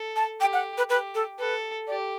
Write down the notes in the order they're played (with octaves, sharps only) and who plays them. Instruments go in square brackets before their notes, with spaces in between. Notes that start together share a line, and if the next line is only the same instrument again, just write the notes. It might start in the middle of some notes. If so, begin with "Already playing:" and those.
Already playing: [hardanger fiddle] A4
[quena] A5
[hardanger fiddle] G4 [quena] G5
[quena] F#5
B4
[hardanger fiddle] G4 [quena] B4
[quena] A4
[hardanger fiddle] A4 [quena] B4
[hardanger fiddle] G4 [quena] D5